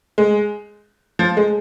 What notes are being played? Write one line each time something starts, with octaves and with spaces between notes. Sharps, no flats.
G#3
F3
G#3